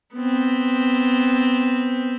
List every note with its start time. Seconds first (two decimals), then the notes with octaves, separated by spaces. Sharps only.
0.15 B3 C4